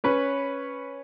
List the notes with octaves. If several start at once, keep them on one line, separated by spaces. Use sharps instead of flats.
C#4 B4 C#5